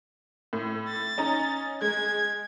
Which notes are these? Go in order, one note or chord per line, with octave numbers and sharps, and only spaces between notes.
A2
A6
C#4 D#4 A#5
G#3 G#6